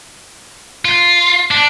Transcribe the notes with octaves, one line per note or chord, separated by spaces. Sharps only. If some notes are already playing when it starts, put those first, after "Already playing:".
F4
D4